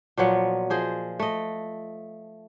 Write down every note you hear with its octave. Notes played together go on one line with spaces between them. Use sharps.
A#2 F3 F#3 B3
F3 G#4 C5 D#5
A3 D#5